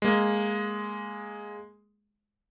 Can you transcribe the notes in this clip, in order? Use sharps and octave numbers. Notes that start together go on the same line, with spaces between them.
G#3 A#3